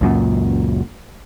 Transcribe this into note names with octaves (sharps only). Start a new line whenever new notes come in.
C#2 F#2 A#2